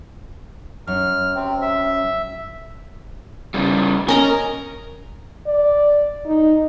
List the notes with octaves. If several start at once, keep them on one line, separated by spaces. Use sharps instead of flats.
F#2 F6
C3 C4
E5
C#3 G3
C#4 A#4 D#5 A#5
D5
D#4